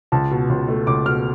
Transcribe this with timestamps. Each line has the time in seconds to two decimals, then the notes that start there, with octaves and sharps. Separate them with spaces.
0.12 C#2 A5
0.31 B2
0.50 C#2
0.68 A3
0.87 C#2 D6
1.06 B2 F6